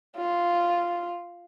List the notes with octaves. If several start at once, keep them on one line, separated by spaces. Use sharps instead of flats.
F4